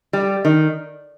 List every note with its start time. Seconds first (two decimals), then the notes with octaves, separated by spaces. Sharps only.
0.13 G3
0.45 D#3